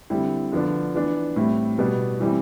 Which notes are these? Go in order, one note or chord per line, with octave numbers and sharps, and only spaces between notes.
D3 G3 C4 E4
D3 F3 B3 D4
E3 B3 D4
A2 G3 C4 E4
B2 G3 B3
E3 G3 C4 E4